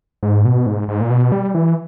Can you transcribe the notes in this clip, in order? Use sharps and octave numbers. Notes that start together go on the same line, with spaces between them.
G#2
B2
G#2
G#2
A#2
B2
G3
E3